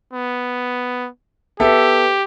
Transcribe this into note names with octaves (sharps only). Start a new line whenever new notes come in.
B3
B3 G4 A4 E5